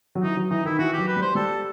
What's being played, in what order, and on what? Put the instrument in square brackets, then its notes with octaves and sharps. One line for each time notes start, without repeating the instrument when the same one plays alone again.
[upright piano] F#3
[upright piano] E3 [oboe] D#4
[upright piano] F#3
[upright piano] E3 [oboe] D#4
[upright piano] D#3 [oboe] E4
[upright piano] E3 [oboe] F#4
[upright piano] F#3 [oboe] G4
[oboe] B4
[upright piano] G3
[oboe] C5
[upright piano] G3 [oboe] A4